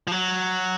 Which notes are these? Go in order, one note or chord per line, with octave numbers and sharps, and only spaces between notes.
F3
F#3